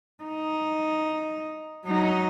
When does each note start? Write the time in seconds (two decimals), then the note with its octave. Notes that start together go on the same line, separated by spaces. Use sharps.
0.24 D#4
1.85 F#3 D#4